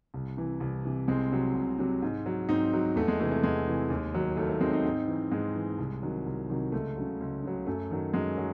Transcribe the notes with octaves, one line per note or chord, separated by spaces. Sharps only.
C2
C3 E3
C2
C3 E3
C2 G#3 C4
C3 F#3
C2
C3 F#3
G#2
F#3
G#2 C4 D#4
F#3
E2 A3
G#3
C3 E3 A3
A3
E2 G#3
C3 E3
D#2
D#3 F#3
D#2 A3
A3
D#3 F#3 G#3 C4
C4 D#4
G#2
E3
G#2 G#3
E3
C2
C3 D#3 F#3
C2
C3 D#3 F#3
C#2 A3
C#3 F#3
C#2
C#3 F#3
F#2 A3
D#3 F#3
F#2 G#3
F#3